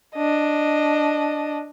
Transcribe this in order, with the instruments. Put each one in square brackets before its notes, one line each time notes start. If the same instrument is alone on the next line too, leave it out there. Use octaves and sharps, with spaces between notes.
[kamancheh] D4 D#5